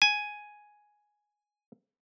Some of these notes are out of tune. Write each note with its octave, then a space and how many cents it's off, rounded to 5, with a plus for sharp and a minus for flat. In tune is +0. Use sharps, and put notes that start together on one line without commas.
G#5 +5